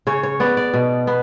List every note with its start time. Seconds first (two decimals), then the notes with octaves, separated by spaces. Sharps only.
0.07 C#3 C#5
0.23 C#5
0.40 B3 D5
0.57 D5
0.74 B2
1.07 B3